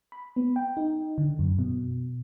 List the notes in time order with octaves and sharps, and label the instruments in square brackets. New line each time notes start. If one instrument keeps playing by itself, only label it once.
[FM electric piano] B5
B3
G5
D#4
D3
F#2
B2